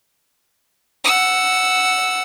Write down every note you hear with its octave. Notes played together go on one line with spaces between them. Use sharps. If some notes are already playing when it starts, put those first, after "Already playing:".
F#5 E6